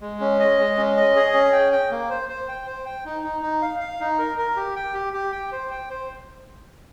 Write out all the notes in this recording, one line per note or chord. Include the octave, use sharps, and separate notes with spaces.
G#3
C#4
D#5
G#3
C#4
D#5
G#4
C#4
G5
G5
A#3
C5
C5
G5
C5
G5
D#4
D#4
D#4
F5
F5
D#4
A#4
A#4
G4
G5
G4
G4
G5
C5
G5
C5